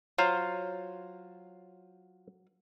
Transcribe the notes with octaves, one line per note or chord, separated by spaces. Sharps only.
F#3 F4 C5 F5